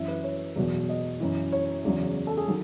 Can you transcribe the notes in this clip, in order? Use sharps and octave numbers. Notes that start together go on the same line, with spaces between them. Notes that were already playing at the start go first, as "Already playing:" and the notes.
Already playing: F#2 E3 E5
B4
C#5
E2 B2 F#3
D#5
F#2 E3
C#5
E2 C#3 F#3
A4
G#4
D#3 F#3